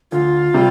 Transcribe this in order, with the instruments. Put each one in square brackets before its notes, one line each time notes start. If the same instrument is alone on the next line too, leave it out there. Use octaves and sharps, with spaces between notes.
[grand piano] D2 [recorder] F4
[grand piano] C3 G3